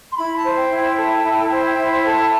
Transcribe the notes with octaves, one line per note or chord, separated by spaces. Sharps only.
C6
E4 B5
A5
C5
G5
E4
G5
A4
E4
C5
E4
A4